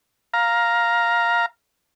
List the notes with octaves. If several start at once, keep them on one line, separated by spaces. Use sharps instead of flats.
F5 A#5